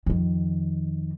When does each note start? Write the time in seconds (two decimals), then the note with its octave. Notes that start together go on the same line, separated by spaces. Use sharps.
0.06 F2 D#3